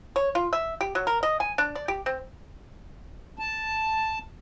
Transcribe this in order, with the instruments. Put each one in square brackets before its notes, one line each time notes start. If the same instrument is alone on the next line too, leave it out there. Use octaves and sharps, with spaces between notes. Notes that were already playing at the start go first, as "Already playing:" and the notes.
[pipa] C#5
F4
E5
G4
F#3
A#4
D#5
G#5
D4
D5
G4
C4
[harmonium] A5